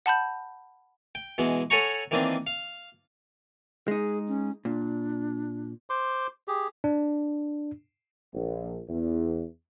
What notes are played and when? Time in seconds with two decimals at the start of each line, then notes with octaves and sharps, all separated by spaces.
0.06 F#5 A5 B5 G6
1.15 G5
1.38 B2 E3 G#3
1.70 A4 C#5 F#5 G#5 A#5 C#6
2.11 D#3 E3 A#3 C4 D4
2.47 F5
3.88 G#3 D#4 G#4
4.28 C#4
4.65 A#2 D4
5.90 C5 C6 D6
6.48 G4 G#4
6.84 D4
8.34 A#1
8.88 E2